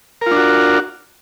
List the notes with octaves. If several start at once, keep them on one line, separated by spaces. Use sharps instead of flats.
D4 F4 F#4 A#4